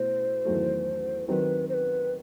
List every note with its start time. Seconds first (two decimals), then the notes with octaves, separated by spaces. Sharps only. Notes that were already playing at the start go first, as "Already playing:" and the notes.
Already playing: B2 A3 E4 C5
0.45 E2 D#3 F#3 A3
1.28 D#3 F#3 C4 B4 C5
1.69 C5
1.74 B4